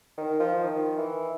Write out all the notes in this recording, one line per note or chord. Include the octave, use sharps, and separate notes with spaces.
D#3
F3
D#3
E3